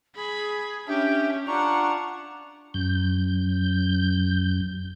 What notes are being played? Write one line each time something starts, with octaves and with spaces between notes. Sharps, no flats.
G#4 B5
C#4 D4 G4 E5
D4 F4 F#5 A#5 C#6
F#2 G6